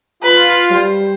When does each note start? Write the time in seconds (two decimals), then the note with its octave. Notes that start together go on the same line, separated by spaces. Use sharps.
0.23 F4 B4
0.71 G3 C5